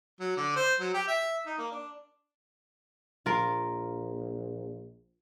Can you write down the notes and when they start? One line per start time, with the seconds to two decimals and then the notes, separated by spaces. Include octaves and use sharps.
0.20 F#3
0.37 D3
0.56 C5
0.80 F#3
0.94 G4
1.07 E5
1.46 D#4
1.58 A#3
1.72 D4
3.26 A#1 F4 A#4